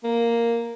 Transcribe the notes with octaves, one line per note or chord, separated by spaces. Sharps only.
A#3